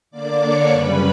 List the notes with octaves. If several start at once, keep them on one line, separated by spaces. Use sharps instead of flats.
D3 A#3 D4 D5 D6
C#5 C#6
F#2 C#3 G3 C#4 B4 B5